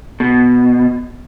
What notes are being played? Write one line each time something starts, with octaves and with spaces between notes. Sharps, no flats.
B2